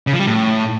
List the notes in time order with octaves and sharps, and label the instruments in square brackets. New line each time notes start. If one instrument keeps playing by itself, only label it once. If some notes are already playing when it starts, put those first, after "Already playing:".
[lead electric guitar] C#3
F3
G3
A2